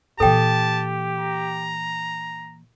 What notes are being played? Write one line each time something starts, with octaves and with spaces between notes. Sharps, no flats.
A#2 E3 G4 A4 G5 A5
A#5